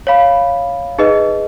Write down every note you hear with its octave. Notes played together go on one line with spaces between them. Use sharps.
C#5 F5 B5
D#4 G#4 B4 D#5